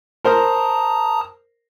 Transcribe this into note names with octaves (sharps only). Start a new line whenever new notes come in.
A#4 C5 A5 A#5 D#6